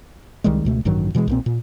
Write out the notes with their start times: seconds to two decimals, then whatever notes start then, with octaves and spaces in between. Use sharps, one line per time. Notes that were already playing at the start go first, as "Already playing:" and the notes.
0.44 C2 D#3 G3 G#3
0.65 C#2 B2 A3
0.85 A1 G2 D#3 F#3
1.15 B2 E3 F3 G#3
1.28 B1 A#2 C4
1.46 A#2